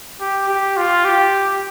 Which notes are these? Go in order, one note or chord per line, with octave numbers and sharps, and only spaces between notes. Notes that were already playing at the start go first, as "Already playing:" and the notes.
G4
G4
F4
G4